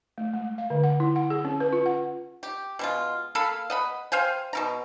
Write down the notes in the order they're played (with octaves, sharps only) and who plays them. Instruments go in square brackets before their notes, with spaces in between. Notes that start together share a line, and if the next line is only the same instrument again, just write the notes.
[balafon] A3
G#3
F5
D3
F#5
E4
F#5
G#4
C#4
B4
F4
F#5
[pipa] G4
B2 G#3 F4
A#3 A4 F5 B5
D#5 F#5 B5
C5 F5 G5 G#5
B2 E4 A#5